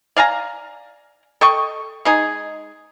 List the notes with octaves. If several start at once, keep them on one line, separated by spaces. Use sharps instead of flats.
D5 F5 G#5 A#5
A4 D#5 G5 C#6
G#3 D#4 G#4